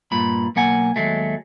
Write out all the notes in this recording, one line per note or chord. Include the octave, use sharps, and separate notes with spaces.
G2 A#2 B5
B1 A#3 F#5 G#5
D#2 F#3 G#3 A3